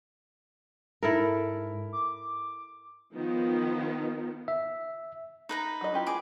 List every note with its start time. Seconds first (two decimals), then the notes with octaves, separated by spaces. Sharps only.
1.03 G#2 E4 A4 A#4
1.93 D6
3.14 D#3 F3 B3
4.48 E5
5.49 D#4 B4 A#5
5.81 F#3 D#5
5.92 E4 F4 G4
6.06 G#4 D6